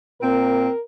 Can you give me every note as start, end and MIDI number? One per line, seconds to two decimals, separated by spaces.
0.21 0.67 46
0.21 0.67 60
0.21 0.82 70